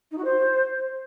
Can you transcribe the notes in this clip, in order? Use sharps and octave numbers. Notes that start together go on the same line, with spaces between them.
D#4
F#4
C5